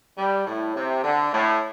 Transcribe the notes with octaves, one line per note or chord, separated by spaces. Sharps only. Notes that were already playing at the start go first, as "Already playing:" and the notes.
G3
A2
C3
D3
A2